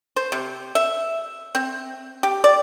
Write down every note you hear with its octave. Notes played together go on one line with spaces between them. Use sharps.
C5
C3
E5
C4
G4
D5